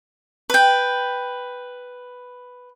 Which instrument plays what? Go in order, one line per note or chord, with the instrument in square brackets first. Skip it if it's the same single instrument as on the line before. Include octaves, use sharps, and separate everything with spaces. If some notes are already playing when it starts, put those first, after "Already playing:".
[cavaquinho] B4 G5